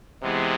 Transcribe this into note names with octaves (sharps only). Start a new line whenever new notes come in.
C3 E3 G#3 B3 E4 G#4